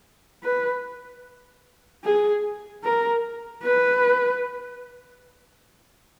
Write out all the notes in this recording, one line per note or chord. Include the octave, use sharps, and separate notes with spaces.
B4
G#4
A#4
B4